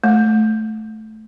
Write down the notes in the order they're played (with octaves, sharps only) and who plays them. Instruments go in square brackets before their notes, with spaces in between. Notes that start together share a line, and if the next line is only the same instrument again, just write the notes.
[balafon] A3